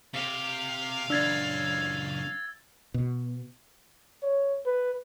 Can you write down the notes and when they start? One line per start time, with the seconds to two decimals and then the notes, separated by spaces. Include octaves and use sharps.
0.14 C3 G4 F5
1.10 C#2 F#2 D4 E6 G#6 A6
2.94 B2
4.23 C#5
4.66 B4